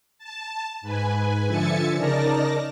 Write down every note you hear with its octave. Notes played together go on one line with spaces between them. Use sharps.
A5
G#2 B4 G#5
D3 F3 E5 G#5 A6 C#7
C#3 D#4 A#4 D5 A5 A#6